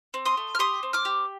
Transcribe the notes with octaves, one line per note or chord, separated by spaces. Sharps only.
C4
C6 D#6
A3
F6
G4 C6 D#6
C4
D6 F6
G4